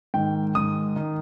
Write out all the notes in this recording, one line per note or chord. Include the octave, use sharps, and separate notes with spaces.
G#2 D#3 G5
G#2 D#3 D#6
D#3